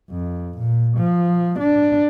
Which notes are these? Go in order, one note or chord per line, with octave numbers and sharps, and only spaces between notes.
F2
A#2
F3
D4